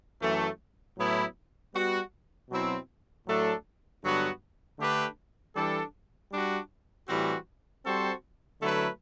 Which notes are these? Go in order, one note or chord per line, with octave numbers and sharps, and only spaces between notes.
F#2 E3 A3
A2 F#3 B3 E4
G3 B3 F#4
B2 F#3 C4 E4
A2 F#3 A3 D4 A4
G2 D3 F#3 B3 F#4
D3 A3 D4 G4 B4
E3 G3 D4 A4
G3 D4 F#4
A2 E3 G3 C4 F#4
G3 C4 F#4 A4 C5
D3 F#3 A3 E4 B4